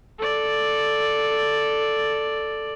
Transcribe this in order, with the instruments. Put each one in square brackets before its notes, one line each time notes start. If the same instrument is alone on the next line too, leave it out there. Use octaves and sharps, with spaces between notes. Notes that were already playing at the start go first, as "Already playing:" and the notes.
[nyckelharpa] A4 D5